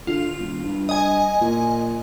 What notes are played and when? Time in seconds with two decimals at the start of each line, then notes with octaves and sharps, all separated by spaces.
0.07 D3 F4
0.38 E1
0.64 G2
0.89 D#5 G#5
1.41 A#2